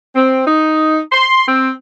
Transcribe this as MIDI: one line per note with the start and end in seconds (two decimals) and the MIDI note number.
0.15 0.46 60
0.47 0.99 63
1.12 1.45 84
1.48 1.70 60